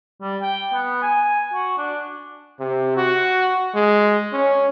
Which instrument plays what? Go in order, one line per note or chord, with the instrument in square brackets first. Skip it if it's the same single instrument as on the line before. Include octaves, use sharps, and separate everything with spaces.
[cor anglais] G3
G5
B3
G#5
F#4
D4
[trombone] C3
F#4
G#3
C#4